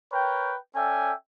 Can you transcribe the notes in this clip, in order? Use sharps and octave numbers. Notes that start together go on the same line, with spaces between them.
A#4 B4 C#5 G5
C#4 A4 D5 E5 G5 G#5